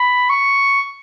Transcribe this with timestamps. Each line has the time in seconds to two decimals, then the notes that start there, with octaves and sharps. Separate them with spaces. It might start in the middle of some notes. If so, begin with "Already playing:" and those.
Already playing: B5
0.30 C#6